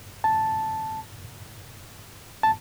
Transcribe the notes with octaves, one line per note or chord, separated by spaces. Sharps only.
A5
A5